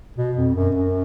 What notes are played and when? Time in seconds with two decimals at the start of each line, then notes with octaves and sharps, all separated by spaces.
0.17 B2
0.37 F2
0.55 F#2
0.75 F#2